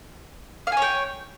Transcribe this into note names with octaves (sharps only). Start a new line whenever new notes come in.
C#5 F5 G5 G#5